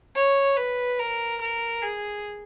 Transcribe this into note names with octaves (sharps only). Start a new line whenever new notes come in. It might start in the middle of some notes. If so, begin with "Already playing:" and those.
C#5
B4
A#4
A#4
G#4